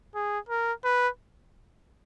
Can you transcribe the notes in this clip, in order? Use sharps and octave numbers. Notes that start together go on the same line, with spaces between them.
G#4
A#4
B4